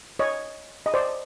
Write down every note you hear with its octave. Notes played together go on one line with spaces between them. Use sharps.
C#5 D#5
D#5
C5 D5